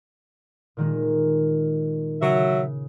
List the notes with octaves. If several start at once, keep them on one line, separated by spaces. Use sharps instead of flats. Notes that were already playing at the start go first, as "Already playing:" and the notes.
A#2 D#3 G#3
C#3 F#3 E5